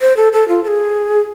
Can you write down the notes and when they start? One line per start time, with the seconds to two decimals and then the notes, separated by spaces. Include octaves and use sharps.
0.01 C5
0.17 A4
0.33 A4
0.48 F4
0.64 A4
0.68 G#4